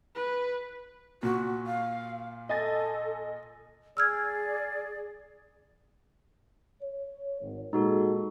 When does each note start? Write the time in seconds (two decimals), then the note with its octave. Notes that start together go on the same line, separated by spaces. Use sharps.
0.15 B4
1.23 A#2 F#4
1.67 F5
2.49 A4 D#5 G#5 A6
3.97 G#4 D5 E6 F6 G#6
6.81 C#5
7.41 G#1
7.73 A#2 G#3 D#4 F#4 A4